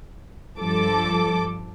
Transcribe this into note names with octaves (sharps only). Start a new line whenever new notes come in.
G2 F3 A4 D6